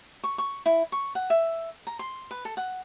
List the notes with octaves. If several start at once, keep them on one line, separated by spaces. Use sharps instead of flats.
C#6
C#6
E4
C#6
F#5
E5
A#5
C6
B4
A4
F#5